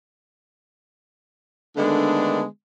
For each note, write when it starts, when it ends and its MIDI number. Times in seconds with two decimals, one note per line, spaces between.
1.77 2.43 50
1.77 2.43 51
1.77 2.43 56
1.77 2.43 57
1.77 2.43 59
1.77 2.43 62